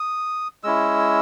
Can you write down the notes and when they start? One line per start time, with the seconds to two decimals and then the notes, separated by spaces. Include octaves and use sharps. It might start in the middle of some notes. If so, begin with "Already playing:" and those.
Already playing: D#6
0.64 G#3 C#4 E4 E6